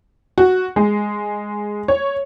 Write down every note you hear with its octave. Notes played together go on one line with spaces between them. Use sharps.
F#4
G#3
C#5